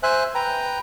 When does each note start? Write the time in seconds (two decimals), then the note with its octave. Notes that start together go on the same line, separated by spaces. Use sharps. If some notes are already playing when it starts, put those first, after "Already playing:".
0.03 C5 E5 G#5 F#6
0.35 B4 G5 A#5